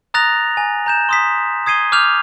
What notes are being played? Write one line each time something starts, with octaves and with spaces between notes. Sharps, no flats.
A#5 D#6 F#6 A6 A#6 F7
G#5
A#5 G6 E7
C6 D#6 B6
D#6 G#6 C7 D#7 G7
D6 F6 G6 F7